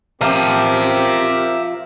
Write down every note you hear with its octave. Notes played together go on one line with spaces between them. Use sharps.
F3 C4 G4 A#4 E5 A#5